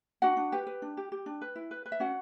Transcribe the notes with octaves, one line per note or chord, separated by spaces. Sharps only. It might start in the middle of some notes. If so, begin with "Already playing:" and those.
D4 F#4 F#5
D4
G4 B4 G5
B4
D4
G4
G4
D4
B4
E4
B4
B4
E5
C#4 F#4 F#5